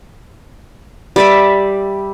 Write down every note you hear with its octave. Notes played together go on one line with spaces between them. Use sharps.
G3 D5 E5